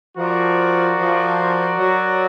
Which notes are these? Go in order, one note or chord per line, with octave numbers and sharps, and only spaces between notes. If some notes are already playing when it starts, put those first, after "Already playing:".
F3 F#4 A#4 D5
F3
F#3